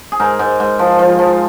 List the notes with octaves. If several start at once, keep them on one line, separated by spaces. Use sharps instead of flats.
G#4
G#2 A#4
G#2
G#2
F3
F3
F3